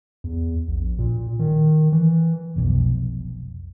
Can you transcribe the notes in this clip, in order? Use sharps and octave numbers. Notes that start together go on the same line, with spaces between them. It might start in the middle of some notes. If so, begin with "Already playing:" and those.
E2
A#1
A#2
D#3
E3
F1 B1